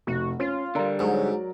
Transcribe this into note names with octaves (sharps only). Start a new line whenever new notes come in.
F1 F#4
C#4 F4
D3 G3 A#4 D5 A#5
G#2 F#3